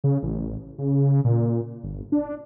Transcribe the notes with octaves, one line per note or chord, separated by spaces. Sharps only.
C#3
A1
C#3
A#2
G1
D4